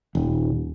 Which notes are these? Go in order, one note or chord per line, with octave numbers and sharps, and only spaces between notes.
D#1